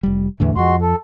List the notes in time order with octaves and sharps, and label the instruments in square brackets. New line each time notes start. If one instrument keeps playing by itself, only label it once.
[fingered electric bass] F1 G3
[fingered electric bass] E2 A2 D3 [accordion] E3
[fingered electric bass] F2 F3 [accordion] G#3 F#4 C6
[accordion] A4